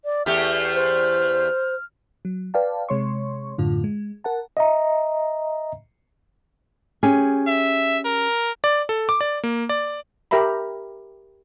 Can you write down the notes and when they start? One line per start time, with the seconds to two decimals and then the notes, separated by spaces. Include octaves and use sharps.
0.05 D5
0.26 E2 A3 G4 E5 F6
0.74 C5
2.25 F#3
2.54 B4 D5 F5 G5 A5
2.89 C3 G#3 C#5 C6 C#6
3.58 F#2 A2 D3 F4
3.84 G#3
4.24 A#4 F#5 A5
4.57 D#5 E5 A#5
7.03 C#4 G4 G#4
7.47 E5
8.05 A#4
8.64 D5
8.89 A4
9.09 D6
9.21 D5
9.44 A#3
9.69 D5
10.31 G4 A#4 E5 A#5 B5